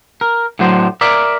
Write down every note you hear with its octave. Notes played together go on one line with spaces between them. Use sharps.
A#4
A2 D3 F#3 C5
A#4 D5 E5